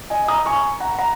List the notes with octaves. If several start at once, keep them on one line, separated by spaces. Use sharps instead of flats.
D#5 G#5
A#5 D#6
G#5 C#6
F#5 A#5
F#5 A#5